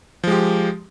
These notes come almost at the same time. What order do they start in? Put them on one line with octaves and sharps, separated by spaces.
F3 G#3 G4